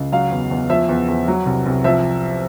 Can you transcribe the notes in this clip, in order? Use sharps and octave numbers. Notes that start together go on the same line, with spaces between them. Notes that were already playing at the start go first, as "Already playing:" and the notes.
Already playing: C#2
F#3 F5
E2
E2
F3 E5
E2
E2
F#3
C2
C2
F3 E5